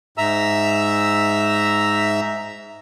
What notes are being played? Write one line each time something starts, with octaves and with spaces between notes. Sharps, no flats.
G#2 E5 A#5 E6